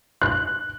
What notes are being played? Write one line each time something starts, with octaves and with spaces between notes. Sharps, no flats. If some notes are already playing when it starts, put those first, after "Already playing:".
F#6